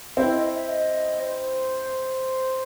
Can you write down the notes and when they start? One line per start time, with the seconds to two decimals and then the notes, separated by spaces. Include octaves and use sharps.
0.17 C4 E4 E5
0.30 D#5
0.43 E5
0.55 E5
0.68 D#5
1.20 C5